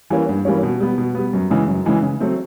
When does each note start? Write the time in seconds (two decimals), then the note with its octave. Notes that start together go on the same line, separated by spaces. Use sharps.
0.10 E3 G3 A#3 C#4
0.29 G2
0.45 E3 G3 A#3 C#4
0.63 B2
0.80 G3 B3
0.98 B2
1.15 G3 B3
1.33 F#2
1.50 C#3 E3 G#3
1.68 F#2
1.86 C#3 E3 G#3
2.03 C#3
2.20 F#3 A3 C4